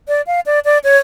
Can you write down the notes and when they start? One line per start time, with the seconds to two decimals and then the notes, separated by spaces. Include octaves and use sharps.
0.08 D5
0.27 F5
0.46 D5
0.65 D5
0.84 C#5